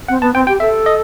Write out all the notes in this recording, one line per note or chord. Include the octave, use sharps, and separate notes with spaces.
C4 F#5
B3 A5
C4 G5
G4 G5
A4 E5
D#5